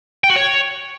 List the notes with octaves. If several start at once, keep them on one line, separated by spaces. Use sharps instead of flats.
G5
F#4
C#5